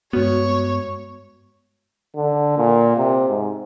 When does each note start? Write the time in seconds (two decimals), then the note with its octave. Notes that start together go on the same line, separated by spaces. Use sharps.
0.13 G2 G#3 B3 F#4 C#5
2.16 D3
2.58 A#2
2.97 C3
3.29 G#2